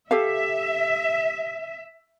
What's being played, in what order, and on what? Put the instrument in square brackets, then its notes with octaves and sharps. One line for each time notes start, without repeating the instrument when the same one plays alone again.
[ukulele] G4 A4 F5 [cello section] E5